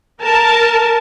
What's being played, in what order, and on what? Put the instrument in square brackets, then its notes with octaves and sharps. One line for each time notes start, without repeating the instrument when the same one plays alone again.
[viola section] A#4 A5